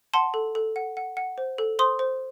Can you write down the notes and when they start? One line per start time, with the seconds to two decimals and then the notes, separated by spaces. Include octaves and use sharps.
0.14 F#5 A5 C6
0.34 A4
0.55 A4
0.76 F#5
0.97 F#5
1.17 F#5
1.38 C5
1.58 A4
1.79 C5 C6 D#6
1.99 C5